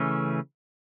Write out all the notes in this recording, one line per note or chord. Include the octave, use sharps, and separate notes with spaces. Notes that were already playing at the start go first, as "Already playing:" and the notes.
Already playing: C#3 E3 A3 C#4